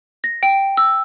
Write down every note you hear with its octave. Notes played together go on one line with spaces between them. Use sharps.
A#6
G5
E6